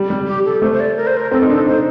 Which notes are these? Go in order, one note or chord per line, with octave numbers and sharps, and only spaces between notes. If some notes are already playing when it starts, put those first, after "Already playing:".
Already playing: G3
G3
G4
A4
A3 C5
C5
D5
A#4
C5
A#4
C4 A4
D#4
D4 A4
D#4 C5